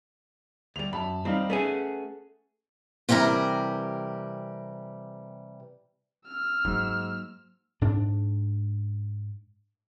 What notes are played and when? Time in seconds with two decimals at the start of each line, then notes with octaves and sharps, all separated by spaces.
0.76 D2 G3 F7
0.93 F#2 A5 B5
1.25 G3 C4 D#4 F5
1.50 A3 C#4 G#4 B4 F#5
3.09 C3 E3 G3 G4 A#4
6.27 E6 F6
6.65 G#2 F#3 A#3
7.81 G#2 D4